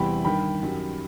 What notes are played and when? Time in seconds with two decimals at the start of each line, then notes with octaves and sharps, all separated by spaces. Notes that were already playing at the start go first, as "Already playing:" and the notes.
Already playing: E2 C3 E3 G3 G5 B5
0.24 G2 D#3 G3 G5 B5
0.63 F#2 D#3 G3